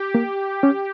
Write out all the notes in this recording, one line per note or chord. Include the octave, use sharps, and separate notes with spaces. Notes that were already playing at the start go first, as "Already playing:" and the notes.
Already playing: G4
A#3
C#4